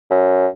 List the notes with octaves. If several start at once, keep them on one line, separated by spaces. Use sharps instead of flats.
F#2